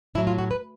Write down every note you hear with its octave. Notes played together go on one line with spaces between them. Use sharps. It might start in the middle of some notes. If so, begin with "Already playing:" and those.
A2 F#3 E4
F4
F#4
B4